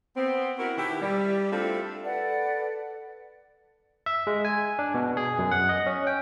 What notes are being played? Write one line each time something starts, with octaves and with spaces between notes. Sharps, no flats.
B3 C4
E4 F#4 A#4
B2 D#3 E4 G4
G3
A3 C4 D4 E4 F4 A4
A4 B4 D5 F#5
E5
G#3
G#5
D4
B2
G#4
F#2
F#5
D#5
C#4
G5